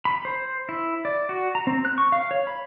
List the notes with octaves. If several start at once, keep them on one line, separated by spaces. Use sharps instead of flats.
B5
C5
E4
D5
F#4
A#5
C4
F#6
C#6
F5
C#5
B5